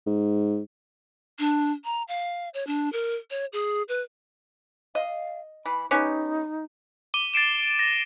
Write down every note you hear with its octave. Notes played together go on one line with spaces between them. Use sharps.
G#2
D4
A#5
F5
C#5
D4
A#4
C#5
G#4
B4
D#5 F5
E3 B5
B3 C#4 D#4 G4
D6 D#7 G7
A6 C7 D7 E7
A#6